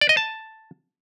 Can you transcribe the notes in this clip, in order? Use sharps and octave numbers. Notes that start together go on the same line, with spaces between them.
D5
D#5
A5